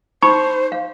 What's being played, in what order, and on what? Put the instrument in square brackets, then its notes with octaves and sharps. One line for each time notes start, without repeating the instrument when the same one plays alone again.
[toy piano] D#4 B5 [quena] C5 [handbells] C#6
[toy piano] F5